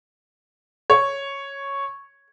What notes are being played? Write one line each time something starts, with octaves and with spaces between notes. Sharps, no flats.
C#5